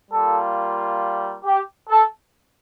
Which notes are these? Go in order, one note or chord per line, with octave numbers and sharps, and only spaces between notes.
G3 A#3 F4 A4
G4
A4